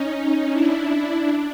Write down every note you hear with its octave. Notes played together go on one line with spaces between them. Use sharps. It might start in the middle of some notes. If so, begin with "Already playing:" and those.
Already playing: C#4 D#4
D4 E4
D4